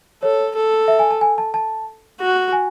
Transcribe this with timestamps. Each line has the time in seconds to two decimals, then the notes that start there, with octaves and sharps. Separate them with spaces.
0.23 A4 C#5
0.55 A4
0.88 E5
0.99 G#5
1.11 A5
1.21 G#5
1.38 A5
1.54 A5
2.20 F#4
2.53 G#5